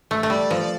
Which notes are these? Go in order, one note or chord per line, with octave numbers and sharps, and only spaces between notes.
A3
A3
G3 D5
F3